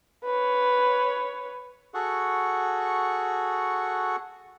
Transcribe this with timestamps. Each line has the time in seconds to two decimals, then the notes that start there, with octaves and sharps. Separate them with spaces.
0.25 B4 C#5
1.94 F#4 G#4 A4 F#5 C#6